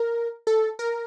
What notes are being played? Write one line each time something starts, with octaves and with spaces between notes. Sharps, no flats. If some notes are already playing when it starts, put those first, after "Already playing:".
Already playing: A#4
A4
A#4